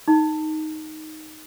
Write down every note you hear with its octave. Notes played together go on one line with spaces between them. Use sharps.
D#4